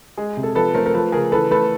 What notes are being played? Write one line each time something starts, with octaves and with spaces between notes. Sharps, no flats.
G#3 G#4
C3
A4
F3 A4 B4
A3 A#4 C5
A#4
F3 A4 B4
C#3 G#4 A#4
E3 A4 B4
A3 A4 B4